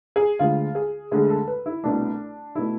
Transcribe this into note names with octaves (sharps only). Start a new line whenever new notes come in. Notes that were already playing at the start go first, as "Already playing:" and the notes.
G#4
D2 D3 G#3 F4
G#4
D2 D3 G#3 G#4
A4
B4
E4
C2 B2 A3 D4
B2 A3 E4